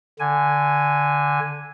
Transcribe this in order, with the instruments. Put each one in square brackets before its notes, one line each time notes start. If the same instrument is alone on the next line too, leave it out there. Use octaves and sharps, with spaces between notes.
[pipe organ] D3 G#5